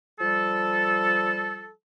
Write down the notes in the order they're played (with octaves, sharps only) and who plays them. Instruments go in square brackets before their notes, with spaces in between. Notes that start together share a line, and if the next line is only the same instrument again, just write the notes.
[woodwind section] F3 G3 A4